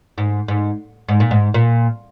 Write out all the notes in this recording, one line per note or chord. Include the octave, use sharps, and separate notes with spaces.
G#2
G#2
G#2
A#2
G#2
A#2